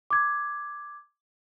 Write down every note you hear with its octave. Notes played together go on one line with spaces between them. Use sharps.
D6 G#6